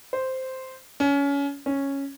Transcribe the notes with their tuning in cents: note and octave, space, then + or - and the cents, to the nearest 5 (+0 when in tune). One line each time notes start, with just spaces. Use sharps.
C5 -5
C#4 +25
C#4 -5